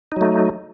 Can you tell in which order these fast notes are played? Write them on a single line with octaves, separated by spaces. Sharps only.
D#4 F#3 A3